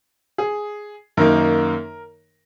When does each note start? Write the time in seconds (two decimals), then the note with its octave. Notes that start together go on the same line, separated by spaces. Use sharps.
0.38 G#4
1.17 F#2 D#3 A#3 D#4 A#4